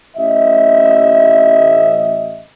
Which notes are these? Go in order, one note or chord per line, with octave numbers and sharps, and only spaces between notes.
A1 D#5 E5